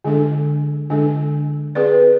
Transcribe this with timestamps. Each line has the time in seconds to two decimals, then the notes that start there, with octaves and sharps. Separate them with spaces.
0.04 D3 G#3 D4 A4
0.90 D3 G#3 D4 A4
1.75 C4 G#4 B4 D5